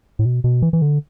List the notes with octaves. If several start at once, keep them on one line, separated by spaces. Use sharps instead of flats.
A2
B2
B2
E3
E3
D3